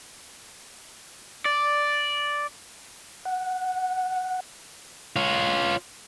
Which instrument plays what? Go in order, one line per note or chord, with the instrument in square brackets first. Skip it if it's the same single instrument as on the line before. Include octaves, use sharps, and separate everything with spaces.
[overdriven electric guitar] D5
[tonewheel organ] F#5
[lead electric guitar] F4 C#5